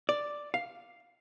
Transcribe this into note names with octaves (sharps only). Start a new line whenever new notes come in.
D5
F5